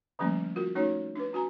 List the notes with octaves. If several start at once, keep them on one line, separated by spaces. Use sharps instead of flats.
D3 F3 G3 A3 A#3 C#4
F4 F#4 A#4
A3 C#4 D#4 F#4 C#5
D4 B4
C#4 F#4 G#5 A#5